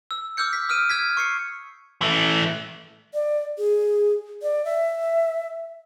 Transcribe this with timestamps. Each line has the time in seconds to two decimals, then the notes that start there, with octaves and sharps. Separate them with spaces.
0.11 E6
0.37 D6 E6 F6 G6 C#7
0.53 B6
0.69 D#6 F6 D7 D#7
0.90 E6 F6 G#6 B6
1.17 C#6 C7 C#7
2.01 E3 A3
3.14 D5
3.58 G#4
4.42 D5
4.65 E5